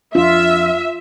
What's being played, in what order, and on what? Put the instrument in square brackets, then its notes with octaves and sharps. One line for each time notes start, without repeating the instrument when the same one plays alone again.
[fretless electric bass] F2 D4 [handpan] F4 [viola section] E5